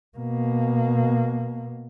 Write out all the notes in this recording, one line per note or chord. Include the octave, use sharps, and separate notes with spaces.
B2 A#3